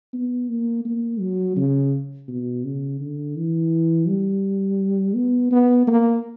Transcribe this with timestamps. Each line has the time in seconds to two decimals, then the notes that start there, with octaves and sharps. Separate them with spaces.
0.14 B3
0.49 A#3
0.85 A#3
1.20 F#3
1.56 C#3
2.28 B2
2.64 C#3
3.00 D3
3.36 E3
4.08 G3
5.15 B3
5.52 B3
5.87 A#3